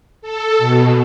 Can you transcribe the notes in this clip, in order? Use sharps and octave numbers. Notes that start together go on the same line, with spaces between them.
A4
B2